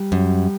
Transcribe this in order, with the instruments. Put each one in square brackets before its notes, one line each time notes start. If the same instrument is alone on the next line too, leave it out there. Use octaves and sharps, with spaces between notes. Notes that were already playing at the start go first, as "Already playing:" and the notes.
Already playing: [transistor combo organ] G3
[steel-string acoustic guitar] F#2